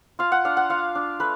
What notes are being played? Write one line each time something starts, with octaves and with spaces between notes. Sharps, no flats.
F4 F5
F#5
D4 F5
F#5
F4 F5
D4
A3 B4